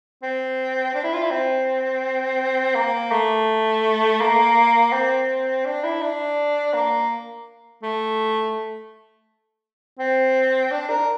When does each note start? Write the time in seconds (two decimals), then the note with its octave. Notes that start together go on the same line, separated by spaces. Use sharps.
0.23 C4
0.95 D4
1.04 E4
1.13 F4
1.23 E4
1.31 C4
2.76 A#3
3.12 A3
4.21 A#3
4.93 C4
5.65 D4
5.84 E4
6.01 D4
6.74 A#3
7.83 A3
9.99 C4
10.72 D4
10.90 A#4